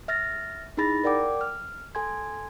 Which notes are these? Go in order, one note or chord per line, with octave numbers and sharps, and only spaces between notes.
E5 F6 A6 A#6
D#4 E4 G#4 B5 A6 A#6
A#4 D5 F#5 G5 D6
F6
A4 G#5 C6 G#6